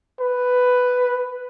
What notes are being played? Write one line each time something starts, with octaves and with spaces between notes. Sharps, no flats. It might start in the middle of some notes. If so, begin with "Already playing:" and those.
B4